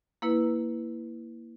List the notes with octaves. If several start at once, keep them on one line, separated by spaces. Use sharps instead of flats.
A#3 E4 B4